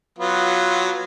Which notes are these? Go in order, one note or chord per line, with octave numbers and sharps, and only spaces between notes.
F#3 B3 F4